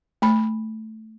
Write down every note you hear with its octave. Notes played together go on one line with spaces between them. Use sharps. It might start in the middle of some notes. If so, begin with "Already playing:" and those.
A3 B5